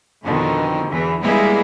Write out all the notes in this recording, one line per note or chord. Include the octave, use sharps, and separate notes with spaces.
F2 B2 D3 D#3
E2 E3
G3 G#3 A#3 B3 E4 G#4